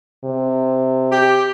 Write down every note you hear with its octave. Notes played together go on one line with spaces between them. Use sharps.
C3
G4